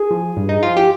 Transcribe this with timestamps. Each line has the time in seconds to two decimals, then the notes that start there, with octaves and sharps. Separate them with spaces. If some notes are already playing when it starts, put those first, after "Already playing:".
Already playing: G#4
0.11 F3
0.37 G2
0.49 D#4
0.63 F3 F4
0.77 G4